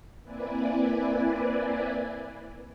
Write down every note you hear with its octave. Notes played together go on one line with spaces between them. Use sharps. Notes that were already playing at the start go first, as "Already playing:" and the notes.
A#3 C4 E4 B4 D5 G#5